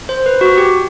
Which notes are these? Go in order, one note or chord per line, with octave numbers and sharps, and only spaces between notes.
C5
B4
F#4
G4